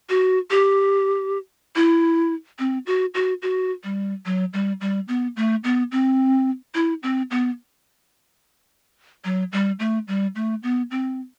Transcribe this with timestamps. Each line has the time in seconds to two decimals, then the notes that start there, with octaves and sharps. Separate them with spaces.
0.09 F#4
0.51 G4
1.76 E4
2.59 C4
2.86 F#4
3.14 F#4
3.42 F#4
3.84 G3
4.26 F#3
4.53 G3
4.81 G3
5.08 B3
5.36 A3
5.64 B3
5.92 C4
6.75 E4
7.03 C4
7.31 B3
9.25 F#3
9.52 G3
9.79 A3
10.08 G3
10.35 A3
10.63 B3
10.91 C4